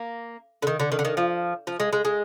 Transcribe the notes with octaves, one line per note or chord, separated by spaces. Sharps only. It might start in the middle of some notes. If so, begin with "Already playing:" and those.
Already playing: A#3
D3
D#3
D3
D#3
D3
D#3
F3
F3
G#3
G#3
G#3